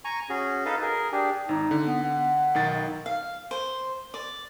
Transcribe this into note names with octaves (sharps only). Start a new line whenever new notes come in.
G#5 A#5 C#6
C#4 F#4 G#4
D#4 A4 B4 D#5 F5
G#4 A#4
D4 G4 G#4
G#1 D#4
D3
B3
F#5
B1 D#3 A6
F5
C5
D5